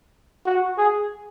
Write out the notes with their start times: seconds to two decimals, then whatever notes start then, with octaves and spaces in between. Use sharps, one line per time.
0.46 F#4
0.78 G#4